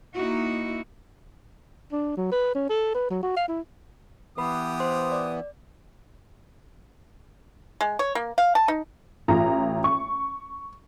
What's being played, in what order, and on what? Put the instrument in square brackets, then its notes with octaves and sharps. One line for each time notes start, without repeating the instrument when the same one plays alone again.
[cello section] A#3 D#4 E4 F#4
[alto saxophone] D4
F#3
B4
C#4
A4
B4
F#3
F#4
F5
E4
[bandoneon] E3 B3 [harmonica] G4 D#6 [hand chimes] B4 B5
[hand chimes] C5 C6
D5
[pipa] G#3
C#5
A#3
F5
A5
D#4
[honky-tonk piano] A1 F4 A#5
C#6